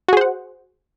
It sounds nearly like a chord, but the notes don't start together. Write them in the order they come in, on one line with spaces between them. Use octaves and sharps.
F#4 G#4 C5 F#5